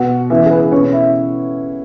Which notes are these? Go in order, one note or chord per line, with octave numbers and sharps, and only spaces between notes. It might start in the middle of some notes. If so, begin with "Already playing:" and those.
Already playing: B2 B3 F#4 F#5
C#3 E3 B3 E4 E5
G#4
B4
B2 B3 C#4 C#5
E4 E5